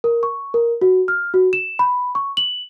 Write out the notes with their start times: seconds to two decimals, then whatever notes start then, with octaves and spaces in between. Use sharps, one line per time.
0.04 A#4
0.23 C#6
0.54 A#4
0.82 F#4
1.08 F6
1.34 F#4
1.53 E7
1.79 B5
2.15 C#6
2.37 F#7